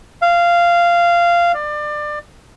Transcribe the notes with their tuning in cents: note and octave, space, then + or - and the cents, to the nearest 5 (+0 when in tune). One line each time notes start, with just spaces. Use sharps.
F5 -15
D5 +25